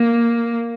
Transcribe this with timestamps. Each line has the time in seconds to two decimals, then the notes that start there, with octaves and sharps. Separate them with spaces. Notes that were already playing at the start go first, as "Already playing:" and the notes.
Already playing: A#3